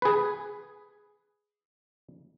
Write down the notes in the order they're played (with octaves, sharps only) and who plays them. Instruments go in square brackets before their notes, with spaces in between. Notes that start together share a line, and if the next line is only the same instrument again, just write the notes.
[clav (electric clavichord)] G#4 B4